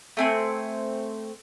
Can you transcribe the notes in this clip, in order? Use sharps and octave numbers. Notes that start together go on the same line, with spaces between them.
A3 C4 G#5